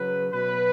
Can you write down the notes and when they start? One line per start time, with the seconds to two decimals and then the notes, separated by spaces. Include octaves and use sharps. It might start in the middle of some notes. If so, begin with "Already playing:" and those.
Already playing: C#3 F#3 B4
0.33 B2 F#3 B4